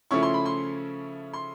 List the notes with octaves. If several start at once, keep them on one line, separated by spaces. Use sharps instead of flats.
C#3 F3 A3 C#4 E4 C#6
C6
B5
C6
C6